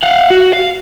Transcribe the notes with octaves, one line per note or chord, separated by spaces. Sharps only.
F5 F#5
F#4
F5